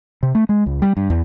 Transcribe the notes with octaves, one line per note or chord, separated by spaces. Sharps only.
C3
A3
G#3
C#2
G3
G2
E2